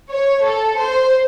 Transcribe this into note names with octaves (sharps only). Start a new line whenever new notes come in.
C#5
A4
C5